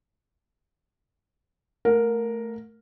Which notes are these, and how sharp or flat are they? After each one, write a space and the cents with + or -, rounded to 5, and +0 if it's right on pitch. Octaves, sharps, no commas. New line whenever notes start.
A3 +0 A#4 +0 F#5 -45